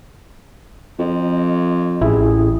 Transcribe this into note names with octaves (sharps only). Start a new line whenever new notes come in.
F2 D#5
A1 E4 G#4